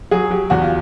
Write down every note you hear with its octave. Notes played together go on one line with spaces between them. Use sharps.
F#3 G#4
F#3 G4
E2 F#4
F4